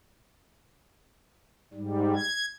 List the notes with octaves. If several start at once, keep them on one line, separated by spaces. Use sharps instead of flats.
G#2 G3
G#6